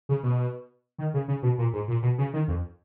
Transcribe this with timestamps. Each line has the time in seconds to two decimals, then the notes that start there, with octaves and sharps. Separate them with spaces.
0.09 C#3
0.23 B2
0.99 D#3
1.14 C#3
1.28 C#3
1.43 B2
1.58 A#2
1.73 G#2
1.88 A#2
2.03 B2
2.18 C#3
2.33 D#3
2.48 F2